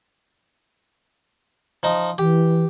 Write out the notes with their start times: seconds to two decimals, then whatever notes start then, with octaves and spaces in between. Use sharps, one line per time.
1.83 F3 D#4
2.18 E3 G4